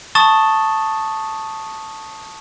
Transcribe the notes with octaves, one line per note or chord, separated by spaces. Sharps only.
A5 C#6 D#6 A6 E7 G7